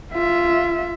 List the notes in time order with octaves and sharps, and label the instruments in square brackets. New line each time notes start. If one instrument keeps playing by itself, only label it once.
[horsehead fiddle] F4 E5